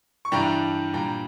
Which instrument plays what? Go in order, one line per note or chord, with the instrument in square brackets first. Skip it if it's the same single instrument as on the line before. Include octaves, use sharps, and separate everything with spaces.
[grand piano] C#6
G2 E3 G3 D4 G5 A#5
A#2 G3 D4 G5 A#5